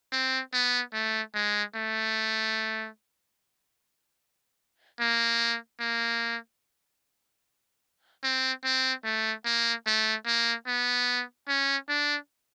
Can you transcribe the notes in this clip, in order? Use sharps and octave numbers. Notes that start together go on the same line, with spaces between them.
C4
B3
A3
G#3
A3
A#3
A#3
C4
C4
A3
A#3
A3
A#3
B3
C#4
D4